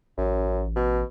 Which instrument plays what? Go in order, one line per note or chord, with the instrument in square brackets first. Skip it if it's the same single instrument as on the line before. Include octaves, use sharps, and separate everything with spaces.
[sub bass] A1 [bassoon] F#2
[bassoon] B2